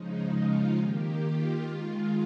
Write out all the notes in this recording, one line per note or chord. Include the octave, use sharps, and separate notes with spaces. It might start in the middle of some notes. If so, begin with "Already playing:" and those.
Already playing: C#3 F3 G#3 D#4
F4
D#3 A#3 G4
F4
D#3 G#3 F4